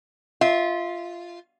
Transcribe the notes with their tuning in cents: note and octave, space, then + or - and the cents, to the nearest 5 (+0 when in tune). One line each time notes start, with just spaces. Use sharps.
F4 -5 E5 -30